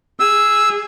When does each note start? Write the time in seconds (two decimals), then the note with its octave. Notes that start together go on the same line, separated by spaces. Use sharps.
0.20 G#4 E6